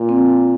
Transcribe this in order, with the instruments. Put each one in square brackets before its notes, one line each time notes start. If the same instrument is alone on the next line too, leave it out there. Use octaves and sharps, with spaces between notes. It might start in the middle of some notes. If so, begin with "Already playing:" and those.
Already playing: [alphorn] A#2
[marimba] C4